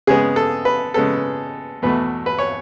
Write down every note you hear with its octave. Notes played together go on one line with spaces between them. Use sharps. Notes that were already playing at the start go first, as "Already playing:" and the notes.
C#3 G#3 B3 G#4
A4
B4
C#3 G#3 B3 A4
E2 B2 A3 B4
B4
C#5